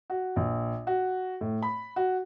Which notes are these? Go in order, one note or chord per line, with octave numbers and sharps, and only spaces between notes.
F#4
A#1
F#4
A2
B5
F#4